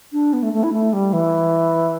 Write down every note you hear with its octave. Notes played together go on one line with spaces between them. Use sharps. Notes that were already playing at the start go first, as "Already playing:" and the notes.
D4
B3
A3
A3
E4
A3
G3
E3